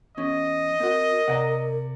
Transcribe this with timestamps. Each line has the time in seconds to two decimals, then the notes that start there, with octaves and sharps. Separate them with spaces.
0.17 E2 C#4 D#5
0.80 C4 F#4 A#4
1.28 C3 D5 F#5 G5 A#5